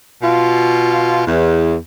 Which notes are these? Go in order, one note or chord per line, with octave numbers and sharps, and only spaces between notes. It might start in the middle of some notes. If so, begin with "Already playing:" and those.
B2 F4
E2